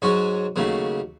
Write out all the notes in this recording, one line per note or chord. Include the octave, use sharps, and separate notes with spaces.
G#2 F#3 C#4 F#4
D#2 C#3 F#3 A3